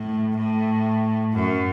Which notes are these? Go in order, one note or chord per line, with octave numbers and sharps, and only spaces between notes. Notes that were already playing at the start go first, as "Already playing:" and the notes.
Already playing: A2
A2
F#2